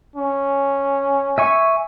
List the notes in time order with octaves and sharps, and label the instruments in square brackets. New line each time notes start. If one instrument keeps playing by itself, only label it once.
[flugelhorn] C#4
[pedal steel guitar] E5 G#5 C#6